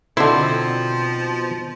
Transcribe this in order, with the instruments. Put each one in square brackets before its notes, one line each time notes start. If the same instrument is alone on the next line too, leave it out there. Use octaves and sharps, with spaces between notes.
[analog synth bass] B2 [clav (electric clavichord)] D3 E4 [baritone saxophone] F3 [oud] C4 D#4